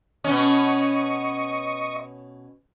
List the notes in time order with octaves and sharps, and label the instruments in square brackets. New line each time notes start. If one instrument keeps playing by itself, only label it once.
[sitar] B2 C#4 [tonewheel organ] D#5 C#6